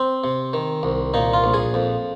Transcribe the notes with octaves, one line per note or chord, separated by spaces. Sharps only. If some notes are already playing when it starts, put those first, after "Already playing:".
Already playing: C4
C3
D#3
C2
A#2 D#4
F4
A#1
G#4
F2